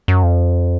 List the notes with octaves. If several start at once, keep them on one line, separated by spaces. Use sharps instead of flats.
F#2
F2